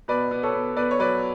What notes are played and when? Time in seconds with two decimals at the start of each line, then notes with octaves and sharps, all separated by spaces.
0.08 B2 B4 D5
0.31 B3
0.43 A4 C#5
0.54 B3
0.77 B3 B4 D5
0.91 C#5
1.00 F#3 B4 D5